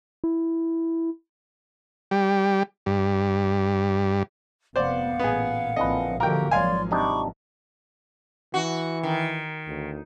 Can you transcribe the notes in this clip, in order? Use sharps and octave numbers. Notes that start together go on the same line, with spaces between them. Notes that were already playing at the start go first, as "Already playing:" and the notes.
E4
G3
G2
F1 B3 C5 D5 F5 F#5
A1 A#2 B3 G#4
A#1 D3 E3 F3 C4 B4 D#5
D3 E3 F3 A#3 F#4 G4 A#4 G5
G#1 F3 F#3 C#5 D5 F5 G#5 C6
C3 D4 D#4 B5 C#6 D6
E3 F#4
D#3
D2